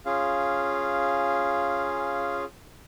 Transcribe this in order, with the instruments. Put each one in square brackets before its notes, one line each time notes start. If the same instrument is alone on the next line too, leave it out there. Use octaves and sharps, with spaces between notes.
[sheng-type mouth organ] C#4 F4 G#4 F5